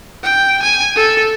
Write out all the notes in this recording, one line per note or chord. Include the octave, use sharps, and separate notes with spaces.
G5
G#5
A4